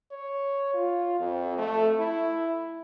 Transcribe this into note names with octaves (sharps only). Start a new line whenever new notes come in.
C#5
F4
F2
A3
E4